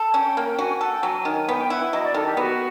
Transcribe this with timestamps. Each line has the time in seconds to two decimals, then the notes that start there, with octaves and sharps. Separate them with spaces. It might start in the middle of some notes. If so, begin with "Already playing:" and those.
Already playing: A4
0.14 C#4 G5
0.37 A#3
0.59 F#4 G#5
0.80 A4 F#5
0.92 G5
1.03 F#3 G#5
1.25 D#3
1.48 B3 G5
1.59 G5
1.70 E4 F#5
1.92 F#3 D#5
2.03 D5
2.14 D#3 A4
2.26 G4
2.37 B3 F#4